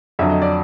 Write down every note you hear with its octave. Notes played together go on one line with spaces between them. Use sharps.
F2 D3 F#3 E5
D#5
D5